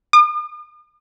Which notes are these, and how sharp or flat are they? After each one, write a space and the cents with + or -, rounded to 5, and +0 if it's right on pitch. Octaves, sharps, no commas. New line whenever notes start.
D#6 -45